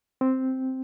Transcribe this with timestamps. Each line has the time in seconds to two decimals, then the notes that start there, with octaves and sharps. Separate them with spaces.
0.21 C4